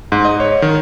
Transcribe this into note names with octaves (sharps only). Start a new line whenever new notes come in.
G#2
D#5
C#5
D#3